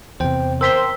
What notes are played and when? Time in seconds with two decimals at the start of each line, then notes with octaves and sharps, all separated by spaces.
0.20 E2 C3 C5 G5
0.61 A#4 C5 G5 C6 E6 B6 G7